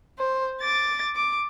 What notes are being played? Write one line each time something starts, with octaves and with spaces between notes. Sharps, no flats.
C5
D6 A6
D6